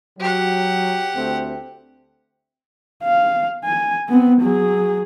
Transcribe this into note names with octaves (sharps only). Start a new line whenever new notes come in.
F#3 G4 F#5
D2 A3 C4
F5
G#5
B3 C4
F#3 G#4